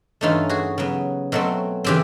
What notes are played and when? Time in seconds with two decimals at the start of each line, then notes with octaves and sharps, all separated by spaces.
0.21 G2 E3 A3 C#4 D#4 F4
0.49 F#4 G#4
0.78 C#3 F#3 B3
1.32 B2 F#3 A3 C4
1.84 C#3 E3 C4 G4